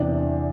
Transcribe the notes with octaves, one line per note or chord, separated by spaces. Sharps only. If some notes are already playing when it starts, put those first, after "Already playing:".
Already playing: E2 C3 E3 D4